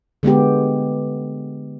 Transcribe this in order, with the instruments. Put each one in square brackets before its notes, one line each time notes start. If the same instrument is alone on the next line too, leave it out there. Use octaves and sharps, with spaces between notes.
[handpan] D3 G#3 B3 G4